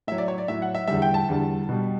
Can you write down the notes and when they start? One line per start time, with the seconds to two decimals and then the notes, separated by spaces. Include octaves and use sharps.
0.07 A2 E5
0.12 F#3
0.18 D5
0.28 C#5
0.38 D5
0.48 A2 F#3 E5
0.62 F#5
0.75 E5
0.87 E2 D3 G3 E5
1.02 G5
1.14 A5
1.29 E2 D3 G3
1.69 B2 G3